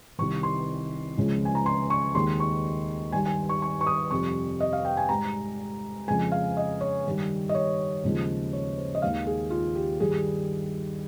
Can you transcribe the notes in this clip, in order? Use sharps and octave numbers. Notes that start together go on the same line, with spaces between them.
C2 C3 D#3 C#6
C6
C#2 C#3 F3 G#3
G#5
A#5
C6
C#6
D#2 D#3 G#3 C6
C#6
G2 D#3 G3 G#5
G#5
C#6
C#6
C#6
D#6
F2 C3 G3 C#6
D#5
F5
G5
G#5
G#2 G3 A#5
F2 C#3 F3 G#3 G#5
F5
D#5
C#5
G2 D#3 G3
D#5
C#5
D#2 C#3 F3 G#3
C#5
C5
D#5
D#2 D#3 G#3 F5
G#4
F4
G4
G2 D#3 G3 G#4